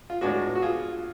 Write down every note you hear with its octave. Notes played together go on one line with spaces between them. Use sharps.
F4
A2 G#3 B3 D4 F#4
F#4
F4 G#4